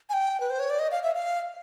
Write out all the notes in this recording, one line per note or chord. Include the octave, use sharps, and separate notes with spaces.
G#5
G5
B4
C5
C#5
D5
D#5
F5
E5
F5